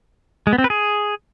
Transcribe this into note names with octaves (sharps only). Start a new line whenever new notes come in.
G#3
B3
C4
B4
G#4